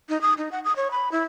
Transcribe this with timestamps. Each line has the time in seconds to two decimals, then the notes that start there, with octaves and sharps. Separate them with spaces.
0.09 D#4
0.21 D#6
0.38 D#4
0.52 F#5
0.65 D#6
0.76 C#5
0.91 B5
1.12 E4